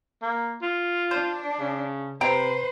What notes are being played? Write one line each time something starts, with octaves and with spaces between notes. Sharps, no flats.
A#3
F4
D4 C5
C#3
C3 B4 C5 G5 A#5